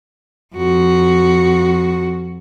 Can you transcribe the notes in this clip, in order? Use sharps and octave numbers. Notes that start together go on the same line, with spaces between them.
F2 F#4